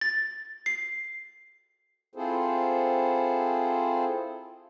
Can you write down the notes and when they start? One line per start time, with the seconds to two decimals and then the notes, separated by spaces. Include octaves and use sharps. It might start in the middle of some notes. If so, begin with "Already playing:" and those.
0.01 A6
0.66 C7
2.15 C4 E4 F4 G#4 A4 C5